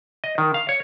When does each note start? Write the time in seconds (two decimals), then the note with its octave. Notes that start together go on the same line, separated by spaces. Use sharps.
0.24 D#5
0.38 D#3
0.54 F5
0.69 C#5